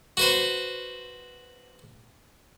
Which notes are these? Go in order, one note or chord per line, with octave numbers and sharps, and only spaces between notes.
F#4 B4 C5